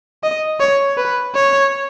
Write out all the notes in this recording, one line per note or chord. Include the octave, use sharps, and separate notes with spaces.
D#5
C#5
B4
C#5